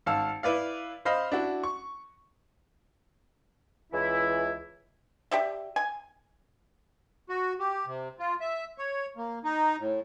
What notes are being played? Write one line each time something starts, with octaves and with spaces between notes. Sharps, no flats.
G#1 F5 A5 E6
E4 B4 D5 F5
C5 D#5 F5 B5
D4 E4 F#4
C#6
C#2 E3 E4
G4 D5 E5
G#5
F#4
G4
C3
F4
E5
C#5
A#3
D#4
A2